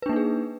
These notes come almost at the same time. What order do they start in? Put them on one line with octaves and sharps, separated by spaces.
B4 D4 A#3 D#4 G#4